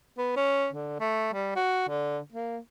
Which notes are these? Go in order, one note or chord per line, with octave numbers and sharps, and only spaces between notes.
B3
C#4
D3
A3
G3
F#4
D3
A#3